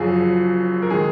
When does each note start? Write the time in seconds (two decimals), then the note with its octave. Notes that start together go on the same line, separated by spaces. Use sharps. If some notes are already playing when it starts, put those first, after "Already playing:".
Already playing: F#1 F#2 F3 G#4
0.82 A#4
0.90 D#3 G#3 G#4